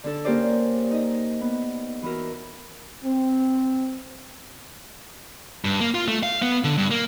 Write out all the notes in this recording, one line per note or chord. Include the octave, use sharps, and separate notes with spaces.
D3 D4 A4
A#3 C#4 G4 A#4 C5 D5
D#4 D#5
B3
E3 E4 F#4 A#4
C4
G2
A#3
F4
A3
F5
B3
D3
G2
A#3